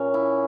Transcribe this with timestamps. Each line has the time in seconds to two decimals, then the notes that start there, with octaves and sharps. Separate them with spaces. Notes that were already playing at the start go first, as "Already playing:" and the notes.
Already playing: A#2 A#3 C#4
0.14 E4